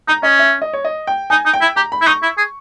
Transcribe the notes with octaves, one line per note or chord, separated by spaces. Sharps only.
D#4 A#5
C#4 D#5
E5
D#5
C#5
D#5
G5
D#4 G#5
D#4
G5
E4
G4 A#5
B5
E4
D#4 C#6
E4
G#4